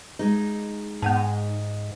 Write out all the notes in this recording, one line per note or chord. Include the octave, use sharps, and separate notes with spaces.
G#3 D#4
G#2 B3 F#5 A5